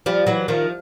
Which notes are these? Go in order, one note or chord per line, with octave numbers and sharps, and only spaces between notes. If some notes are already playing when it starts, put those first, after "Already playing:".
F3 G3
E3 F#3
D#3 F3